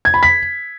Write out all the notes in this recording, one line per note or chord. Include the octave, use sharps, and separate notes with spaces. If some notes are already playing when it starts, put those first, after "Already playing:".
G#6
B5
B6